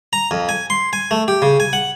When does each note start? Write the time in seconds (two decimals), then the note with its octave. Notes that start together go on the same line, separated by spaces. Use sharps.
0.13 A#5
0.31 F2
0.49 G#5
0.70 C6
0.93 G#5
1.11 A3
1.28 G4
1.42 C#3
1.60 G#5
1.73 F#5